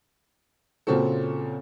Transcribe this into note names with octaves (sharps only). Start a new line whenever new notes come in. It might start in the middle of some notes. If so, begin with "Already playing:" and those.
A#2 C#3 C4 C#4 F#4 A4